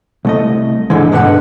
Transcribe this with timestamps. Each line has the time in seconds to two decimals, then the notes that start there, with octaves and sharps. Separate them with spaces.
0.25 C2 A3 D#5
0.90 G#2 D3 E3 G#3
1.12 G2 B2 D3 B4 E5 F#5